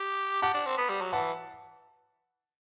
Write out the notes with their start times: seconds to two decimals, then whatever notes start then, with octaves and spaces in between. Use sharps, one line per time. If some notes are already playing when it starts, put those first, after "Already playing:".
Already playing: G4
0.42 G4 F#5 A5
0.54 D4
0.66 C4
0.77 B3
0.89 G3
1.01 F#3
1.13 E3 F#5 A5